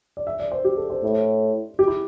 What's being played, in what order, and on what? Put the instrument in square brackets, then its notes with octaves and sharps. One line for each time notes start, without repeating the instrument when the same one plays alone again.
[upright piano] D5
E5
D5
C5
G4
A4
C5
[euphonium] A2
[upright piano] G4
E4